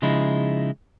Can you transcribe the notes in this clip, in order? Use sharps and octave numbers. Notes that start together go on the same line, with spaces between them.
C#3 F3 G#3 D#4 E4